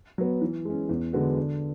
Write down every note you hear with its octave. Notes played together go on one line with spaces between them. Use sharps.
F#3 B3
E3
G#3 C#4
E2
D3 G#3 B3 F#4
D3